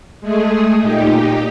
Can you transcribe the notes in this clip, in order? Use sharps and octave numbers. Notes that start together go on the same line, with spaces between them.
G#3 A3 G#4
A#2 D#4 G4